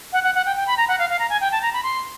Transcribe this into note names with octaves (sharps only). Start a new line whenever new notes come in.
F#5
F#5
F#5
G5
G5
B5
A#5
F#5
F5
F5
A#5
G#5
G5
A5
A#5
B5
C6